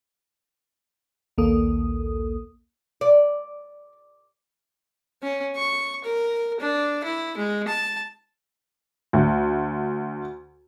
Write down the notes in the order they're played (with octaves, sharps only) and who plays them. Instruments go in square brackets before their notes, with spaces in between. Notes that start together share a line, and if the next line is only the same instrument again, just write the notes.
[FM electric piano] A#1 D#2 A#3 A4 D#6
[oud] D5
[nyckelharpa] C#4
C#6
A#4
D4
E4
G#3
A5
[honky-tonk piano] D2